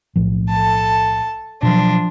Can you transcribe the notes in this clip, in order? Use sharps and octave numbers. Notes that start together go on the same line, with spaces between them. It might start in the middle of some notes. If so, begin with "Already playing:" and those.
B1 A2 F3
A4 A5
B2 F3 F#3 D4